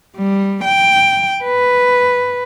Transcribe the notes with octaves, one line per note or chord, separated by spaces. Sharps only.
G3
G5
B4